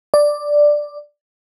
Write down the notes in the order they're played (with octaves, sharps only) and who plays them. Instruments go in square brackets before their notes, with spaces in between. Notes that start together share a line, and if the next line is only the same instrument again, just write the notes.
[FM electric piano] D5